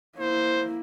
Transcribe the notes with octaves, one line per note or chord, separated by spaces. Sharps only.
A#3 E4 C5